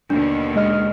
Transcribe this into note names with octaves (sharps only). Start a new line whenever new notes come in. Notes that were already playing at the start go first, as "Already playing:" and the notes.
D#2 B2 D3 D4
G#3 D#5 F6